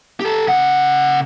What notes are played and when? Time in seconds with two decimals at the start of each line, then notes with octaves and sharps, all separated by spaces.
0.20 G4 A4
0.47 C#3 F#5